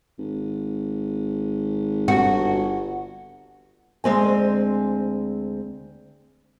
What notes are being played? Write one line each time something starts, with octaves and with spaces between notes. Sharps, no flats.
G#1
G1 F#4
D2 G#3 C4 G#5